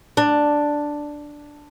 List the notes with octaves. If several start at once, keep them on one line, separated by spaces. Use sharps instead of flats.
D4